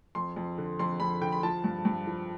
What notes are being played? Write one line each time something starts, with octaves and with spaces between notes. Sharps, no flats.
F2 C6
F2
D3
F2 C6
F2 B5
D3 G5
B5
F3 A5
G2
G2
F3